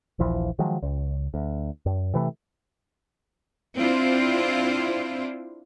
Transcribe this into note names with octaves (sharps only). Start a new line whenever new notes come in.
D#1 A#1 E3 F3
D#3 F3 F#3 G#3
C#2
D2
F#2
C3 E3 A3
C4 D4 E4 F4 C5